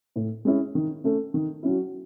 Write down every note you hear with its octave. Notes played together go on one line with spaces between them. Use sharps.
A2
G#3 C#4 E4
D#3
A3 C#4
D#3
F#3 C#4 E4